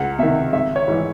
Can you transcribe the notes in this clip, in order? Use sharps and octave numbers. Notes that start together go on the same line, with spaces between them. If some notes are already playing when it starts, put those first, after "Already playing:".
Already playing: C#2 F#5
C3 D#3 E5
G#1 E5
C#5
G#2 E3